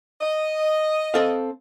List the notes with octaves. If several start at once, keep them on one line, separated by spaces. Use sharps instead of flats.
D#5
C4 A4 F5